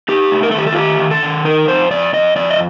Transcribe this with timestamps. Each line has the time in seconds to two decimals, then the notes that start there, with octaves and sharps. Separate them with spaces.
0.08 D#4 G4
0.31 A3
0.43 A#4
0.51 A4
0.54 D#3 G4
0.67 A4
0.72 F4
0.76 A3 G4
0.99 D#3
1.11 A4
1.23 D#3
1.45 D#4 A#4
1.67 F2 C5
1.91 F2 D5
2.13 F2 D#5
2.36 F2 D5
2.51 D#5